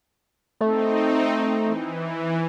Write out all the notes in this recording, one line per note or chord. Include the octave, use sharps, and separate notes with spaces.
A3 C4 D#4
E3